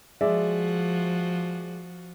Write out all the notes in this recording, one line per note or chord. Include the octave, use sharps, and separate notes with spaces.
F3 G#3 F#4 D5 E5